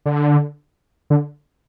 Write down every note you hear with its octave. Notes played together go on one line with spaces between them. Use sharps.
D3
D3